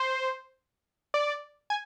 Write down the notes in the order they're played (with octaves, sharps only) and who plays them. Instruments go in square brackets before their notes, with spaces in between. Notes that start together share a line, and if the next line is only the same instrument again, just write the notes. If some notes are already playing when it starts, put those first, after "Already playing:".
Already playing: [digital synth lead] C5
D5
G#5